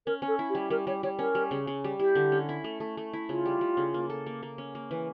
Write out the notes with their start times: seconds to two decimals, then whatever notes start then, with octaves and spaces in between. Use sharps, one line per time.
0.06 C#4 A#4
0.22 C#4
0.28 A4
0.39 E4
0.50 G4
0.55 G3
0.70 G3 A#4
0.87 G3 C#5
1.03 G3 C#5
1.19 C#4 A#4
1.35 G3
1.51 C#3
1.67 C#3
1.84 G3
1.99 E4 G4
2.15 D3
2.32 C#4
2.49 E4
2.64 A3
2.80 A3
2.97 A3
3.13 E4
3.29 C#3 F4
3.46 G3
3.61 G3
3.77 C#3
3.94 A#3
4.10 A4
4.26 A#3
4.43 A#3
4.58 C#4
4.75 A#3
4.91 E3